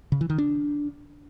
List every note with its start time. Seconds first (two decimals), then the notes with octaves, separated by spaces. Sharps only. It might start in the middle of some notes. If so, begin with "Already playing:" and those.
0.12 C#3
0.21 E3
0.30 D#3
0.38 D4